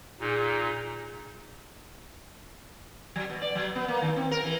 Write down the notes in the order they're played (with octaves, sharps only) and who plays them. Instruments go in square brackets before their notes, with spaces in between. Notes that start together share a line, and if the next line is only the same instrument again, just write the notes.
[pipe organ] A#2 D#4 [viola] G#4
[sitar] F#3
B2
D5
F#3
B3
A#3
D#3
C4
A#4
E3